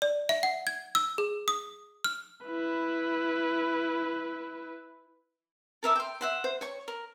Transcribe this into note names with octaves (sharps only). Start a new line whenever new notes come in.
D5
E5
F#5
G#6
E6
G#4
D#6
F6
E4 B4
A4 A#4 E5 D6
G5 C6
E5 F#5 C6
C5
C#5 C#6
A#4